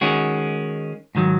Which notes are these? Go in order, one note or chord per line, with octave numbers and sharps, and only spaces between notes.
D#3 G#3 C#4 F#4
G#2 D#3 F#3